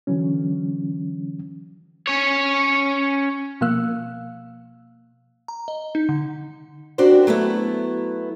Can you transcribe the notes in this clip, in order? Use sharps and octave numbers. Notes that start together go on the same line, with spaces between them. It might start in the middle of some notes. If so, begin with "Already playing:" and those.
D3 E3 F#3 C#4
C#4 C#5
B2 F3 A#3 F5 E6 F#6
A#5
D#5
D#4
D3
C4 D4 F#4 G4 A#4 C5
F#3 A3 B3 E4